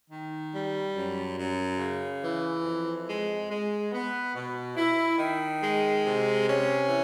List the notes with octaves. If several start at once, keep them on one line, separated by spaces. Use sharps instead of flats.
D#3
G3
F#2
F#2
C#3
E3
F2
G#3
G#3
B3
B2
E4
D#3
G#3
C3
C#4
E3